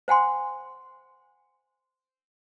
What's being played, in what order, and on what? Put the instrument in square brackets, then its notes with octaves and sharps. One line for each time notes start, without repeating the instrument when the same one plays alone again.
[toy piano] C5 F#5 G#5 C6